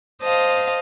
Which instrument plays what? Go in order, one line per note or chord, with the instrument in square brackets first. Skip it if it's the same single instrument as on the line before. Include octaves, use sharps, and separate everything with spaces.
[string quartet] C5 D#5 F5 A5